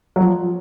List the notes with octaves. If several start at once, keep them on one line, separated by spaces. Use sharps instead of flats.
F#3
F3